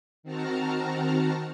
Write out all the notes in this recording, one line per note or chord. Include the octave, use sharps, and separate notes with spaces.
D#3 C4 F#4 A5 A#5 F6